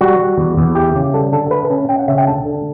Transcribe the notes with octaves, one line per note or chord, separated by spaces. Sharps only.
G3 F#4
G3
E2
E2
E3 G4
C#3
G3 A4
D3 A4
A3 B4
C#4 A5
C#4 G5
F#5
C#3 E5
G5
D2 A5
D3